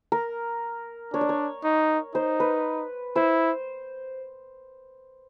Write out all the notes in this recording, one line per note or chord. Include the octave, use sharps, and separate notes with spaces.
A#4
D4 C#5
D5
C#5
D#4
D#4 C5
B4
E4 C5